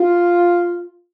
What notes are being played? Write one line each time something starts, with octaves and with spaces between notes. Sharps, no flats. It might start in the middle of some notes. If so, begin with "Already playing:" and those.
Already playing: F4